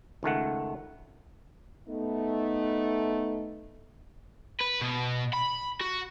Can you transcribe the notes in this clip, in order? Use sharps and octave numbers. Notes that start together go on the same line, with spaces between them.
C#2 D#3 A3 F#5
A3 B3 D#4
B4
B2
B5
F#4